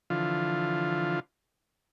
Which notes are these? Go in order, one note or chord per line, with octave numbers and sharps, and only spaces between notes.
D3 E3 F3 F4